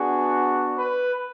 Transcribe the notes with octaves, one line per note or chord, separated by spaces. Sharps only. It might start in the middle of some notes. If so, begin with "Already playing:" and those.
Already playing: B3 D4 F#4 G#4
B4